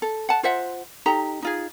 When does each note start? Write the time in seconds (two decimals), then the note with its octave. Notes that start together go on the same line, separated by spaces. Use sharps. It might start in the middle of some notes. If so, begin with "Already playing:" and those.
0.02 A4
0.29 F#5 A5
0.43 F4 C5 E5 F#5
1.06 D#4 G4 A4 A#5
1.42 D#4 F4 G#4